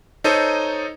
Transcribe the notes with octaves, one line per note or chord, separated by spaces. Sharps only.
D#4 A4 C5 C#5 D#5